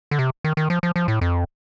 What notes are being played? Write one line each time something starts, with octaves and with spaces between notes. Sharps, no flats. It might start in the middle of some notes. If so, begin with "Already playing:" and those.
D3
C3
D#3
D#3
F3
F3
F3
A2
F2